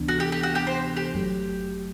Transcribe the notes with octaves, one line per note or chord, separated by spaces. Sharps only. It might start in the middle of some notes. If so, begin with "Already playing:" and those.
Already playing: D2 C3 E3 B3 D4
F#4
G4
G4
F#4
G4
C5
G4
G1 F#2 F#3 A3